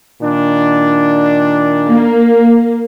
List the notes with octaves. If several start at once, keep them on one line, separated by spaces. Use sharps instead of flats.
A#2 D#3 D4
A#3